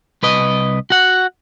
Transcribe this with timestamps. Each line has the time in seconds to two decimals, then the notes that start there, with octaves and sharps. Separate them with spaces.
0.23 C2 B4 D#5
0.90 F#4 F#5